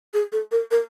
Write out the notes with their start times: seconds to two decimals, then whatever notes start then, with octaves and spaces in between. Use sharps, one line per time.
0.14 G#4
0.32 A4
0.52 A#4
0.71 A#4